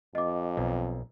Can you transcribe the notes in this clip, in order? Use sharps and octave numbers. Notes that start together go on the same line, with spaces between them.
F2 D#5 D6
B1